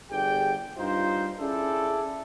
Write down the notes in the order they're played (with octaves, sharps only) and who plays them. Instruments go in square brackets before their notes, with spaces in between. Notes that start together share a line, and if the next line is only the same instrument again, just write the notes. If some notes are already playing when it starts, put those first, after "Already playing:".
[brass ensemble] G1 G4 G#4 D5 G5
G2 D#4 F4 C5
C#4 E4 G#4 A4 D5